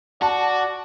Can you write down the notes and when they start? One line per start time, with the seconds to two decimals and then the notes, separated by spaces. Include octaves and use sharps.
0.22 F#4 D5 A5